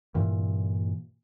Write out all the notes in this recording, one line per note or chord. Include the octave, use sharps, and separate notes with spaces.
G2 A#2 E3